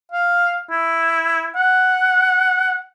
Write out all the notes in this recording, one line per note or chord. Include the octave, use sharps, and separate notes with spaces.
F5
E4
F#5